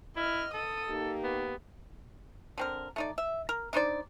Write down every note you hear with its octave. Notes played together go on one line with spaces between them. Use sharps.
E4 D#5 F6
A4 D#6
A#3 D#4 G4
B3
D3 C4 A#4
A3 D#4 D5
E5
A#4
D4 D#4 C5 D5